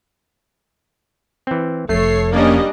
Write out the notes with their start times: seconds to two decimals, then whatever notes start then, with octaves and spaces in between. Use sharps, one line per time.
1.47 E3 C4
1.89 F1 F2 A3 A4 C#5 C7
2.32 G3 A#3 C#4 D4 D#5